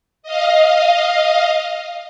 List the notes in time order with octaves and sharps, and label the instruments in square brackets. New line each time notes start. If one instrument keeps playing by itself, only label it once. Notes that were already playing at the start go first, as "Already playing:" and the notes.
[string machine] D#5 F5